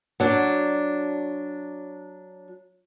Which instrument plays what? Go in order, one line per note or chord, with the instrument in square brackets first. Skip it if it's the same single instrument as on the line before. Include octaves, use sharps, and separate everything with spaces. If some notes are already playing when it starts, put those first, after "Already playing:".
[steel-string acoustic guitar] F#3 D4